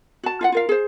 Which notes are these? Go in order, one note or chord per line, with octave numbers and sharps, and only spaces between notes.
F#4 A5
F4 F5 F#5
F4 A#4 F5
G#4 C5